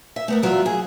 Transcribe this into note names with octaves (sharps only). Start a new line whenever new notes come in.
E5
A3 B3 A#4
E2 F#3 F4 G#4 B4 E5
G#4